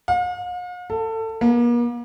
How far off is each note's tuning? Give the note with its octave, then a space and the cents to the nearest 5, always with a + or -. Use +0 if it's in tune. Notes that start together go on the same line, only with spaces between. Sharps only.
F5 +45
A4 +25
A#3 +45